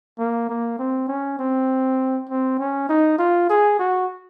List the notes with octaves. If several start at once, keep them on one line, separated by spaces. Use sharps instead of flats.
A#3
A#3
C4
C#4
C4
C4
C#4
D#4
F4
G#4
F#4